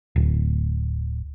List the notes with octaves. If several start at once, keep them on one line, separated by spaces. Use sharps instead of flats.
D1